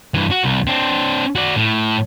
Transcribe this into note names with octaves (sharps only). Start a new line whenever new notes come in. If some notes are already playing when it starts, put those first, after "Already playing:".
G2 E3
F#4
C2
C4 D4
F#4 D5
A2